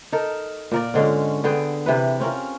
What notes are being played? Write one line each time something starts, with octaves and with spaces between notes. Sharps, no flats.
D#4 A4 A#4
A#2 A#4 D5
G#2 D3 G#3 C#4
D3 B3 G#4 G5
C3 E3 B4
C4 C#4 F4 A#4